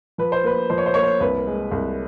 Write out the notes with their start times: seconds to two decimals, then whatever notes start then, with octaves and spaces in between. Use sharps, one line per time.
0.18 F3 B4
0.32 C5
0.44 A#3 B4
0.70 F3 C5
0.78 C#5
0.86 C5
0.94 A#3 C#5
1.03 C5
1.20 C2 B4
1.47 G#3
1.72 C2